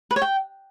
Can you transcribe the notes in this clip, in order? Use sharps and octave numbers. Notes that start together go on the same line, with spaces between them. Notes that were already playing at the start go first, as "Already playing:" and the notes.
B4
C#5
G5